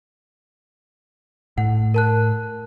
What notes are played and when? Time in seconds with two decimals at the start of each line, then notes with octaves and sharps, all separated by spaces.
1.58 A2 F#5
1.94 A#4 A5 F#6